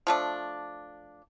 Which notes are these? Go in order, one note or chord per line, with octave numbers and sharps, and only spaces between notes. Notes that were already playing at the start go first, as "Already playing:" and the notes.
F3 A3 D4